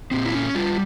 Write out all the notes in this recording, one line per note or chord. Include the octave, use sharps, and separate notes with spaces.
A#2 C4
E4
C#4
G3 F4